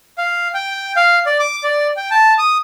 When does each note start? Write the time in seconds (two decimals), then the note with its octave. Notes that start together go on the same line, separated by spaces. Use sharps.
0.18 F5
0.54 G5
0.96 F5
1.26 D5
1.39 D6
1.64 D5
1.96 G5
2.11 A5
2.38 D#6